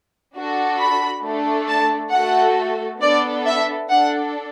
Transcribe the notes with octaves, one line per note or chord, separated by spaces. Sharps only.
D4 F#4 A4
B5
A3 D4 A4
A5
A3 F#4 A4 F#5
B3 D4 A4 D5
E5
D4 A4 F#5